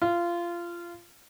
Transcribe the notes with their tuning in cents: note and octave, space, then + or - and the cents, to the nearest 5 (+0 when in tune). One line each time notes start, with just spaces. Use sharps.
F4 -20